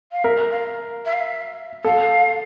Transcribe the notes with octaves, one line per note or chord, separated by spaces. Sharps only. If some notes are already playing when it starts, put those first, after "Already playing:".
F5
A#4 E5
F5
E5
F5
E5
A4 F5